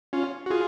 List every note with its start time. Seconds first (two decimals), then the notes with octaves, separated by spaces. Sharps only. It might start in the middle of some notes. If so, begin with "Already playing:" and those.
0.13 C#4 F4
0.46 F#4
0.50 F4 G#4